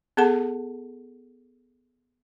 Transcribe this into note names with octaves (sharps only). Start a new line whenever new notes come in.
B3 G#4 A4 F#5 A5